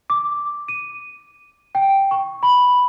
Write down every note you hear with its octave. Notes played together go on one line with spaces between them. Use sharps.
D6
D#7
G5
C#6
B5